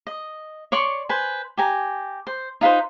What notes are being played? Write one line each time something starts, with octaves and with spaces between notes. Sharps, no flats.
D#5
C#5 D5 C6 C#6
B4 C5 G#5
G4 G#5 A#5
C5
D#4 F4 B4 C5